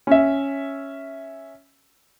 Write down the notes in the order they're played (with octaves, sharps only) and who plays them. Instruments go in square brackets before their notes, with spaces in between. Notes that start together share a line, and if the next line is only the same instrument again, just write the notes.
[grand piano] C#4 E5